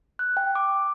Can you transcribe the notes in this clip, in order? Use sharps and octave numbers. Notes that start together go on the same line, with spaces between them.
F#6
G5
D6